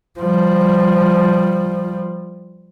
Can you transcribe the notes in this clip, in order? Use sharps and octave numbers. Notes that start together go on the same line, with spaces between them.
F3 G3